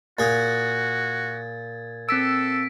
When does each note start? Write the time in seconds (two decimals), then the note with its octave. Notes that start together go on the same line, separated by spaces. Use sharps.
0.19 A#2 F#4 G#4 G#6 A6
2.09 C4 A4 E6 B6 D7